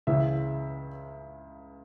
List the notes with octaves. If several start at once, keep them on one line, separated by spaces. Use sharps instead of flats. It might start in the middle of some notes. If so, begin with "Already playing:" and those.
C#2 C#3 E3 E5